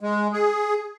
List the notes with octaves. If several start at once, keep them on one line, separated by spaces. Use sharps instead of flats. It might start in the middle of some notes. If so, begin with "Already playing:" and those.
G#3
G#4